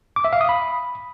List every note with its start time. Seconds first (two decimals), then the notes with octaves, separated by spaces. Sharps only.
0.16 D6
0.24 E5
0.33 F5
0.41 D#6
0.49 B5